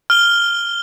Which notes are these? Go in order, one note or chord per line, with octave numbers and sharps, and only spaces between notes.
F6 G7